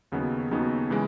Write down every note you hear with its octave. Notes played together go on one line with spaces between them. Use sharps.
D#2 C#3 F#3 B3 D#4
D#2 C#3 F#3 B3 D#4
C#3 E3 G#3